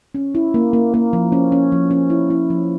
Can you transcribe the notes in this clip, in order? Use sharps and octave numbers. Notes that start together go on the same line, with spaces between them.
C#4
E4
A#3
A#3
A#3
F3
C#4
C#4
F3
C#4
E4
E4
F3